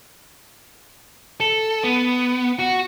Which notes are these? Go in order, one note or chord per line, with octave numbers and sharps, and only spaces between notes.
A4
B3
F#4